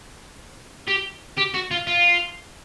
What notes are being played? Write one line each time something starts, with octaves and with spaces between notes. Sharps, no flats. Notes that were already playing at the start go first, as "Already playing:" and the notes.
G4
G4
F#4
F4
F4